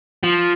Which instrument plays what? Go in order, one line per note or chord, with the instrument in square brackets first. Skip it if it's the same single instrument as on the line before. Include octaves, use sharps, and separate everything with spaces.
[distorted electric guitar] F3